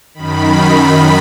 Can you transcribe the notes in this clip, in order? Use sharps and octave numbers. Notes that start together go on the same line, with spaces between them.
F#2 D#3 B5